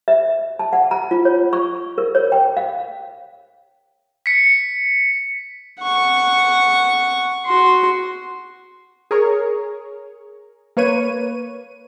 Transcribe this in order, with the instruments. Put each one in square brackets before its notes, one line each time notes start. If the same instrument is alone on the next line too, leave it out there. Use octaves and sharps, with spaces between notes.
[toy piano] E5
A5
F#5
A#5
F4
C#5
C#6
A#4
C#5
G5
F5
[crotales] B6 C#7
[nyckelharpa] F#5 C#6
F#4 C6
[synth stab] G#4 A#4 C#5
A#3 B4 C#5 D#7